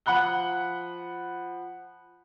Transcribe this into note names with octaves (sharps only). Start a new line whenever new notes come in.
F3 F#5 B5 F#6 G7